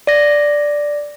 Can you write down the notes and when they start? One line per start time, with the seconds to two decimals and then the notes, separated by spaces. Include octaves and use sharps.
0.07 D5 A#6